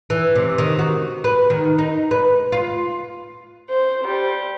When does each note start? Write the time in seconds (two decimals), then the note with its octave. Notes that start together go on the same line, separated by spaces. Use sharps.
0.10 E3
0.35 C3
0.58 D#3
0.79 F#4
1.24 B4
1.50 D#3
1.78 D#4
2.11 B4
2.52 F4
3.69 C5
4.03 G3